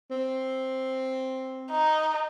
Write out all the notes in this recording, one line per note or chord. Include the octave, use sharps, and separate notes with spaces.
C4
D#4